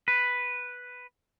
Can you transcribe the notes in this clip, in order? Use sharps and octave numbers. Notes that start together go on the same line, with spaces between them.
B4